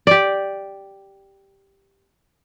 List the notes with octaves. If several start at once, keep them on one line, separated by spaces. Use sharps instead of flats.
G4 D5